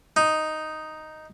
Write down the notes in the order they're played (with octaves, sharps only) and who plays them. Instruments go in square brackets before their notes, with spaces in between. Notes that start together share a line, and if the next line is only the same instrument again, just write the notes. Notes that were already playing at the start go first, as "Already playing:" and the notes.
[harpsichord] D#4